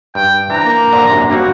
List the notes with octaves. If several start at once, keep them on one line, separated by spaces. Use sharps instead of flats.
G2 G5
E3 F3 D4 A#5
A#3
A#2 D3 F3
F#2 C3 D4
G3 A#3 C4 F#4